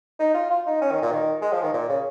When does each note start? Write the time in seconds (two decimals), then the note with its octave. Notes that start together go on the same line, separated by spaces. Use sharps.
0.20 D#4
0.35 F4
0.50 F4
0.66 D#4
0.81 C#4
0.92 D#3
1.02 A#2
1.12 D#3
1.42 G#3
1.53 F3
1.63 D#3
1.74 A#2
1.89 C#3